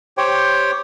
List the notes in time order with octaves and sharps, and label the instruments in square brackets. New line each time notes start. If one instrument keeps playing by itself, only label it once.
[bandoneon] G4 C5 C#5 G5